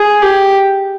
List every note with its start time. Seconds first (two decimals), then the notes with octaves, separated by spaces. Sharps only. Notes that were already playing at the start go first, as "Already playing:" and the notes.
Already playing: G#4
0.22 G4